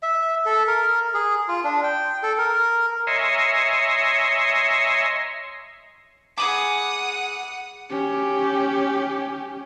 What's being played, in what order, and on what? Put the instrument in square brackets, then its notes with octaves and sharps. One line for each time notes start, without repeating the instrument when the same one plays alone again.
[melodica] E5
A4
A#4
G#4
F4
D4
G5
A4
A#4
[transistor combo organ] C#5 D#5 E5 G#5 A#5 C6
[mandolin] G#4 B5 D6 [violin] F#5 D#6
[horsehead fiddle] C#4 G4